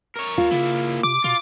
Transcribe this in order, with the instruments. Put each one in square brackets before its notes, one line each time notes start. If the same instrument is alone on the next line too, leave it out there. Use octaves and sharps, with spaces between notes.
[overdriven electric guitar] A#4 C#5
[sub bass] D#2 [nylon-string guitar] F4
[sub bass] C#3 [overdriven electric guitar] A#3 E4
[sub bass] C3 [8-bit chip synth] D6
[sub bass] B2 [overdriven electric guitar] F4